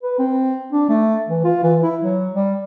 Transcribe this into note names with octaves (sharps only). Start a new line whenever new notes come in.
B4
C4
D4
A3
E3
F4
E3
E4
F#3
G3